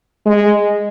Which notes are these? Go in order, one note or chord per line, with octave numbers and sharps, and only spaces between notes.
G#3